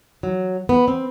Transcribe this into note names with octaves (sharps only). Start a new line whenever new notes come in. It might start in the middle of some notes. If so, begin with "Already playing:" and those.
F#3
B3
C4